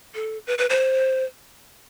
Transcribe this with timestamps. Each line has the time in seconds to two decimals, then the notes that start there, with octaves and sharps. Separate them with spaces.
0.15 A4
0.47 B4
0.58 B4
0.70 C5